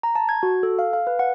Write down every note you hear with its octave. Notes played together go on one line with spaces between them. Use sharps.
A#5
A5
G#6
F#4
A4
F5
F5
B4
F#5